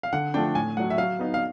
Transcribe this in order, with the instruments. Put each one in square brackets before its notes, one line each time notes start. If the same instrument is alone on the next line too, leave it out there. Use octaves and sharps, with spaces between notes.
[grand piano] F5
D3 F#5
F3 A3 D4 G5
A2 G#5
F#3 A3 F#5
E5
F#3 F5
B3 D#4
F5